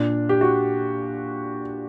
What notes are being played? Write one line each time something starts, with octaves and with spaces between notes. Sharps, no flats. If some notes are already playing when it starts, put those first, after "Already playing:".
Already playing: A#2 D4
G4
F#4